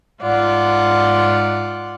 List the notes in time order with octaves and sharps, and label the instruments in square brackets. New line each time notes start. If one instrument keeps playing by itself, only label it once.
[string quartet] G#2 F4 D5 F#5